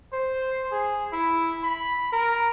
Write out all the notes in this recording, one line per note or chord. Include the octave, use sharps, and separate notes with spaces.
C5
G#4
E4
B5
A#4